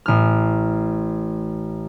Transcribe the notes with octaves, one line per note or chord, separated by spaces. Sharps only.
A1 F6